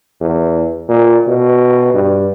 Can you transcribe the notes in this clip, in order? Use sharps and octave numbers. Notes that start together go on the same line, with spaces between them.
E2
A#2
B2
G2